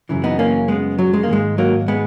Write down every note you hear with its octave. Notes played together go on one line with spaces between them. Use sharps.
F#2 C#3 E3
B3 D#4
A#3 C#4
G#3 B3
F#3
G#3
A#3
G#2 D#3 G#3
F#3 A#3
G#3 B3